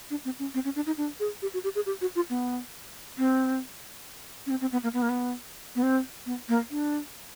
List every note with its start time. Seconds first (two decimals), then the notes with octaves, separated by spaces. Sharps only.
0.10 D4
0.25 C4
0.39 C#4
0.54 C4
0.65 C#4
0.76 D4
0.87 D#4
0.98 D4
1.20 G#4
1.42 G4
1.54 F#4
1.64 G4
1.75 G#4
1.86 G4
2.01 F#4
2.15 F4
2.30 B3
3.18 C4
4.46 C#4
4.50 C4
4.61 C4
4.72 B3
4.83 A#3
4.94 B3
5.02 A#3
5.09 B3
5.75 B3
5.83 C4
6.26 B3
6.49 A#3
6.71 D4